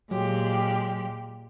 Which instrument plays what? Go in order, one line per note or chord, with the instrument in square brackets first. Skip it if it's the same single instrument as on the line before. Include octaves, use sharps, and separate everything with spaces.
[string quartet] A#2 G#3 G4 [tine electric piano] F#3